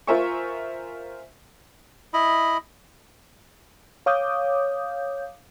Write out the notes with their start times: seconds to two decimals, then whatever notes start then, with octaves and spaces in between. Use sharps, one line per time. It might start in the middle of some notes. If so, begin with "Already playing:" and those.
0.07 F4 A#4 C5 E5 G#5 C#6
2.14 E4 D#5 B5
4.06 C#5 F5 D6 D#6 G6